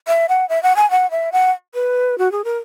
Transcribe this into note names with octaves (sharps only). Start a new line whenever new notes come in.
E5
F#5
E5
F#5
G#5
F#5
E5
F#5
B4
F#4
G#4
A#4